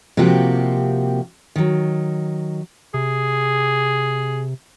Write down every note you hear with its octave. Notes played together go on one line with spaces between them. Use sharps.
C3 F3 A#3 C4 F#4 G4
D#3 F#3
C3 G#4